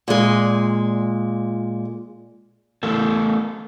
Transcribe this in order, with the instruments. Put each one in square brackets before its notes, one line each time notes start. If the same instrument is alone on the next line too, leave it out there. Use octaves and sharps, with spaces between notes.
[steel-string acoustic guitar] A#2 G#3
[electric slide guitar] E3 A3 A4 A#4